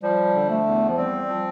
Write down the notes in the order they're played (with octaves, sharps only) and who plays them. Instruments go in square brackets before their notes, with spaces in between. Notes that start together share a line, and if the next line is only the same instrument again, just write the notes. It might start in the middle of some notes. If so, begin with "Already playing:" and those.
[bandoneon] F3 [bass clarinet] G3
[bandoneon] D3
[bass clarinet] A3
[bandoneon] E2
[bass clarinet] F3
[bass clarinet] G3 [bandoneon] C4
[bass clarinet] G3
[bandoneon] F3